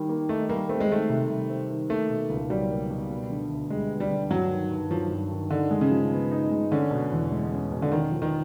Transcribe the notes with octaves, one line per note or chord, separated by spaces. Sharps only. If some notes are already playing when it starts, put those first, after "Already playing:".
Already playing: D#3 G3 D#4
A#3
A3 D#4
G3 A#3
A3 C4
G#3
D#3 A3
C3
G3
C4
D#3
A3 A#3
B2
C#2
F#3 G3
A#3
B2
B3
D3
D2
G3 G#3
B3
G3
D3
G2 F#3
D#3
G2
F3 F#3
G2
D#3
D3 D#4
G#3
C#3
F3
B3
D#4
G#3
D3 C#4
B2
E2
G#3
C#4
B2
D3
D#3 C#4
F3
D#3